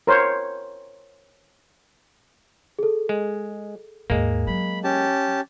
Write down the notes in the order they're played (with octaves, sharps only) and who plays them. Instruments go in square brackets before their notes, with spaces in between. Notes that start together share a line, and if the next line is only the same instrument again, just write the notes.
[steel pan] A#4 C5 C#5
[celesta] G#4 A4
[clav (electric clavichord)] G#3
[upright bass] D#2 G#2 [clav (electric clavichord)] G#3 A#3
[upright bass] F#3 [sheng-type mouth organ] B5
[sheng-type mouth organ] C#4 G4 A5